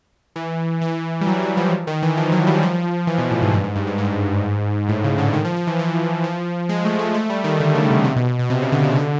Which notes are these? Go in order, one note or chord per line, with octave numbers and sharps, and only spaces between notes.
E3
E3
G3
F#3
F#3
F3
D#3
E3
F3
F#3
G3
F3
E3
B2
A2
G#2
G2
G#2
G2
G#2
G#2
A2
C#3
D3
D#3
F3
F3
E3
E3
F3
G#3
A3
A3
A3
G3
D#3
D3
C#3
C3
C3
B2
B2
B2
C3
C#3
D3
C#3
D3